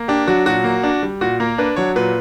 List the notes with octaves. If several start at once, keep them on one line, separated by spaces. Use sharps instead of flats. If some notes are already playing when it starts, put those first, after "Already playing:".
Already playing: A#3
D4 G4
F#3 F#4
A#2 F#4
A#3
D4
G3
A#2 F#4
A#3 A#4
D4 B4
F#3 C#5
A#2 B4